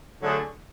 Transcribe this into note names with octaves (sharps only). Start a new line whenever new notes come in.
D3 F#3 A3 D4 G#4